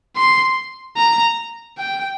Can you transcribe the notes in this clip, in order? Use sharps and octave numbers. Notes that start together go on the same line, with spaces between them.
C6
A#5
G5